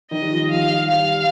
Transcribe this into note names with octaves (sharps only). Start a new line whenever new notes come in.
D#3 D#5
G3
F3
F3 F5
G3
G3 F5